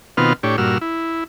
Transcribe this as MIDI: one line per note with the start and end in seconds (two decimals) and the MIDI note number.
0.17 0.33 47
0.17 0.33 51
0.17 0.33 59
0.17 0.33 60
0.17 0.33 65
0.17 0.33 89
0.43 0.56 45
0.43 0.56 62
0.43 0.56 67
0.43 0.56 73
0.58 0.78 43
0.58 0.78 46
0.58 0.78 66
0.58 0.78 88
0.58 0.78 89
0.81 1.24 64